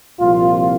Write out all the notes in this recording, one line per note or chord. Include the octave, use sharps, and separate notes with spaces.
C2 A#2 F3 F4